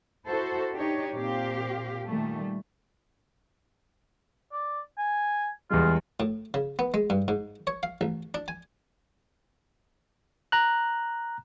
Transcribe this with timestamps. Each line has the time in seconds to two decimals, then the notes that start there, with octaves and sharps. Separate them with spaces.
0.27 E4 F#4 A4 C5
0.76 D4 D#4 G4 C#5
1.16 A#2 C4 G4 F5
2.06 A#2 D#3 G3 A3
4.53 D5
4.98 G#5
5.70 E2 G3 G#3 F4
6.20 A2
6.54 C#3
6.79 B3
6.94 G#3
7.10 G2
7.28 G#2
7.67 C#5
7.83 F5
8.01 A1
8.34 D4
8.48 G#5
10.52 A#5 F#6